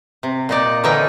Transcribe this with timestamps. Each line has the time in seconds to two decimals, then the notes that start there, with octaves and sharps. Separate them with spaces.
0.23 C3
0.49 A#2 D#4 D5
0.84 D3 E3 C#4 D#4 G5